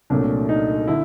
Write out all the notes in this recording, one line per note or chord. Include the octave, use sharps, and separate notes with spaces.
C2 A#2 F#3 A3 D4
D#4
D3 E4